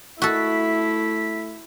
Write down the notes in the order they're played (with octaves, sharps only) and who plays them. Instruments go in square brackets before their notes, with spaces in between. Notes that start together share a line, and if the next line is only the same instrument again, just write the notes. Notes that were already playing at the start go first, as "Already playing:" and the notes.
[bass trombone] A3 [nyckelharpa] E4 [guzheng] F#4 A4 [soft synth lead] B6